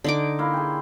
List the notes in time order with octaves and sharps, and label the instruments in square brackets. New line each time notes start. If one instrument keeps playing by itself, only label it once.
[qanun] D3 D#4 D6
[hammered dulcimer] A#3 E4 C6
G#4 G5